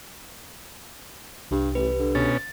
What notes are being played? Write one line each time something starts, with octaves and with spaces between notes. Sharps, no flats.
C2 G2 G4
A1 B4
D3
B2 C#4 A6